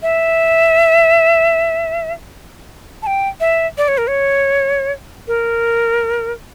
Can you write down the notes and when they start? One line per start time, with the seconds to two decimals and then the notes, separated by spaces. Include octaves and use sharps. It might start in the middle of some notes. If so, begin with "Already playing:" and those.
0.03 E5
3.03 A5
3.07 G5
3.40 E5
3.78 D5
3.88 C#5
3.98 A#4
4.08 C#5
5.28 A#4